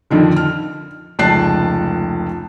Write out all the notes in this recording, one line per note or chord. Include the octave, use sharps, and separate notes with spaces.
F2 D3 D#3 F3
F6
F1 C#2 A5 F#6 C7